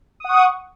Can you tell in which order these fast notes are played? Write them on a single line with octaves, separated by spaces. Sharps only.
D#6 F#5 C#6